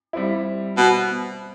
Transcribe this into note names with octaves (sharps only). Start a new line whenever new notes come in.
G3 C4 E4
B2